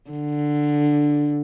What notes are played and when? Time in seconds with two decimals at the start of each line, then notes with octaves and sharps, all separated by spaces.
0.10 D3